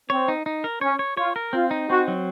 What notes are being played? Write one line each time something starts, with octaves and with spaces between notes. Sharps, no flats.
C4 C#5
D#4
D#4
A#4
C#4 C#5
C#5
F4 C#5
A#4
C4 F4
D#4
C4 F#4
F#3